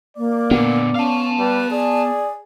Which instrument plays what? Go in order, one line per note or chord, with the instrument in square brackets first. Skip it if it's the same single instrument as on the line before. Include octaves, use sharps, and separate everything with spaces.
[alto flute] A#3 [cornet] D5
[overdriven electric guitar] A#2 D3 [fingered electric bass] B3
[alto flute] C#4 [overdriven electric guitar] F5 A5
[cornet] G3 [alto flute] B4
[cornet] G#4 [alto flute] D5